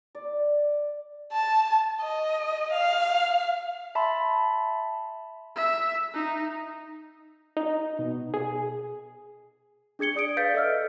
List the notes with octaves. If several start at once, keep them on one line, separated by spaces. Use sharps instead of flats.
D5
A5
D#5
F5
E5 A5 B5 C6
E5
D#4
D#4
B2
G#4
D4 G#4 G#6 C#7 G7
D5 D#6 C#7 D7
B4 D5 F5 G6 A6 B6
A4 D#5 E5 E6 F6